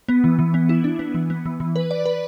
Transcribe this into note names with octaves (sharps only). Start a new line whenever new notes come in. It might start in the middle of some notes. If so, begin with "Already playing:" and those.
B3
E3
E3
B3
E4
D4
B3
E3
B3
E3
E3
B4
D5
B4